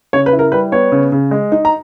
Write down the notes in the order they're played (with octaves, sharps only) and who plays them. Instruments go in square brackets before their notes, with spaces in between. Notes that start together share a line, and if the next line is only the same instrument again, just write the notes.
[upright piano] C#3 C#5
B4
E4
A#4
G3 B4
B3 C#5
C#3
C#3
G#3
D#4
A#5